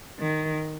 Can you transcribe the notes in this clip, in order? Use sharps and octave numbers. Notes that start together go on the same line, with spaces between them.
D#3